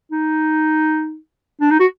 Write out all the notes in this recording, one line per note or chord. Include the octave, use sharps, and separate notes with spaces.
D#4
D4
D#4
F#4